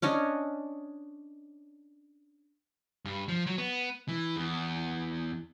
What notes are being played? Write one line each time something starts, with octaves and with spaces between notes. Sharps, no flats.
C#4 D4 C#5 D#5
G2
F3
F#3
B3
E3
E2